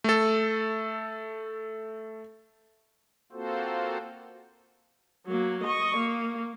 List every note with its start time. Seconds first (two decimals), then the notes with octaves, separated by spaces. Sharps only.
0.04 A3 A4
3.32 A#3 C4 F4 F#4 A4 C5
5.27 F#3 A#3
5.63 D#5 C#6
5.97 A#3